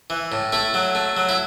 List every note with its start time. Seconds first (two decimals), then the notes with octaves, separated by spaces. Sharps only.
0.10 E3
0.32 A2
0.52 A3 E4
0.74 F#3
0.95 A3
1.17 F#3
1.29 E4